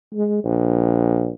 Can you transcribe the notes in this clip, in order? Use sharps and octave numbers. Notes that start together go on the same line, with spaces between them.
G#3
A#1